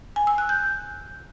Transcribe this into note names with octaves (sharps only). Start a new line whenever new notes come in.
G#5
E6
F#6
G6